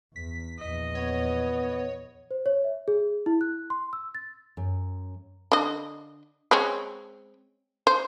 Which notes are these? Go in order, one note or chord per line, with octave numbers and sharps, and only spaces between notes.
E2 B6
A#1 E2 D#5
B3 C#5
C5
C#5
E5
G#4
E4
F#6
C6
E6
A6
F#2
D3 D#5
G#3 C4 C#4
C5